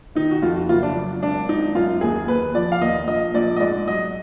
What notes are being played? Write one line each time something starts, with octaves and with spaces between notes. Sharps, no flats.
D#3 D#4
F#4
F2 F4
F#4
F#1 F4
D4
F#3
G#1 D4
G#1 D#4
F#2 F4
D#2 G#4
D#2 B4
F3 D5
F5
D#2 D#5
A#1 D#5
A#1 D5
D#5
G#2 D5
F#3 D#5